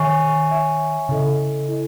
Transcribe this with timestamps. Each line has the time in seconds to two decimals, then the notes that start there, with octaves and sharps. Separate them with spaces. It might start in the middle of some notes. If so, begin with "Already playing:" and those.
Already playing: D#3 C#5 E5 G#5 C#6
0.50 C#5 E5 G#5 C#6
1.09 C#3 E4 A4 D#5
1.68 E4 A4 D#5